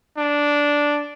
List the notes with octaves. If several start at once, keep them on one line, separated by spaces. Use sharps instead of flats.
D4